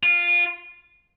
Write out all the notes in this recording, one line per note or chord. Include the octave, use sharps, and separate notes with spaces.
F4